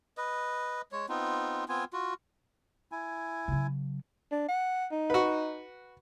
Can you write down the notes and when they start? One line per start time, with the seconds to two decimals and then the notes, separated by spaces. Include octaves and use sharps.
0.17 B4 D#5
0.92 G#3 C#5
1.09 B3 C4 D#4 F4
1.69 B3 C4 F4 G#5
1.93 F4 F#4
2.92 E4 G#5
3.48 C#3 F#3
4.31 D4
4.48 F#5
4.91 D#4
5.10 F#4 B4